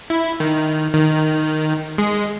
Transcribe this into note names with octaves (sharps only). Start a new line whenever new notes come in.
E4
D#3
D#3
G#3